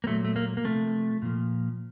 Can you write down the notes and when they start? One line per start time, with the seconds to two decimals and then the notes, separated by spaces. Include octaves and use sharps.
0.04 A#3
0.07 A#2 F#3 A3 C4
0.25 A3
0.36 A#3
0.57 A#3
0.64 C3 F3 A3
1.22 A#2 F3